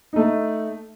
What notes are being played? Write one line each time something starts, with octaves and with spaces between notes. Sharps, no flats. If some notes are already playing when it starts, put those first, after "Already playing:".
A3 D#4